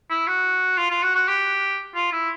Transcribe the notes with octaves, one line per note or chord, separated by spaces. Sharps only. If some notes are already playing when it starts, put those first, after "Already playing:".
E4
F#4
F4
F4
F#4
F#4
G4
F4
E4